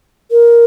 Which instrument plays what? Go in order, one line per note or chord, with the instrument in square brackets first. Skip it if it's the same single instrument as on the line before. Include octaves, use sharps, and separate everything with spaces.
[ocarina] A#4